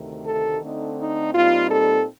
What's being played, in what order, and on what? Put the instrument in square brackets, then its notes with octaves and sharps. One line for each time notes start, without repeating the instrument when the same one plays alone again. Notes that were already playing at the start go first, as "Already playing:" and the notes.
Already playing: [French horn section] D2 C3 D#3 A3
A4
D3 A3 C4 D#4
D#4
A#2 G3 C4 D#4 F4
A4